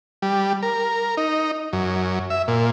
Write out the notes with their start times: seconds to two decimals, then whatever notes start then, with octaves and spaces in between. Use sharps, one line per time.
0.22 G3
0.63 A#4
1.17 D#4
1.73 F#2
2.30 E5
2.48 A#2